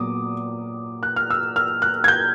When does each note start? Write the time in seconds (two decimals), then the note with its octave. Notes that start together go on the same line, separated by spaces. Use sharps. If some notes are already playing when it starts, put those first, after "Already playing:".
Already playing: A#2 F#3 B3 D6 D#6
1.03 F#6
1.16 F6
1.30 E6
1.56 F6
1.82 F#6
2.04 G#6
2.08 G6